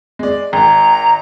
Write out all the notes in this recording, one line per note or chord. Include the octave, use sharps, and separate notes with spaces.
G#3 D5
G#1 A#5